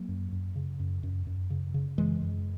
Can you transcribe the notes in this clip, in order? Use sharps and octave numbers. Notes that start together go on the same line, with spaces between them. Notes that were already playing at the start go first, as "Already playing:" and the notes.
Already playing: F#3 A#3
F#2
F#2
C#3
F#2
F#2
F#2
C#3
C#3
F#2 E3 G#3
F#2